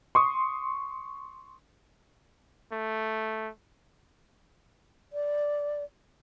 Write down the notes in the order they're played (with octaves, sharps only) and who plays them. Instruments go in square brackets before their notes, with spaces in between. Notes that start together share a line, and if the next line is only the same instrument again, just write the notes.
[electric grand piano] C6 C#6 D#6
[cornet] A3
[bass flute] D5